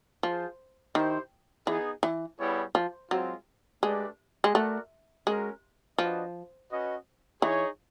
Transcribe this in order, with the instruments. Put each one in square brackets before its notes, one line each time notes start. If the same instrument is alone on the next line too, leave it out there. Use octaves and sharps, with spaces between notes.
[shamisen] F3 [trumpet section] F4 G#4 C5
[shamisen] D#3 [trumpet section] E4 G4 C5
[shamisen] E3 [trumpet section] B3 D#4 G#4
[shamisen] E3
[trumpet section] G3 B3 E4 G#4 C#5
[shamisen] F3
[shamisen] F#3 [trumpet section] G#3 C4 F4
[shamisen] G#3 [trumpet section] A3 D4 G4 B4 D5
[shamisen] G#3
[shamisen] A3 [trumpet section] F#4 A#4 D5 F#5
[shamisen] G#3 [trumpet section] C#4 F#4 A#4
[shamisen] F3 [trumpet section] D4 F#4 B4 D#5
[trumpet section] C#4 F#4 B4 D#5
[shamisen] E3 [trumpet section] D#4 G#4 C#5